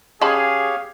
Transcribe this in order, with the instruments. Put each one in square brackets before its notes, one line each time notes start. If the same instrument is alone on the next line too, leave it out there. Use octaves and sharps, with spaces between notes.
[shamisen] C#3 A5 B5 [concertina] G4 C#5 F5 [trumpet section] G#4